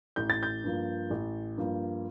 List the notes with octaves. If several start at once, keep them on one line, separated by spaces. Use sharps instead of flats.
A1 G6
A6
G6
G2 F3 A#3
A1
G2 F3 A#3